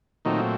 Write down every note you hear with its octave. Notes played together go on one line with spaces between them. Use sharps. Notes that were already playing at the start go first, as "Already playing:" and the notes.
A#2 D#3 F#3 A3 C4 D#4